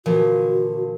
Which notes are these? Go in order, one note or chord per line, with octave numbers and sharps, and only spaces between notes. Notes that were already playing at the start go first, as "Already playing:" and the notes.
A#2 D3 E3 F3 F#4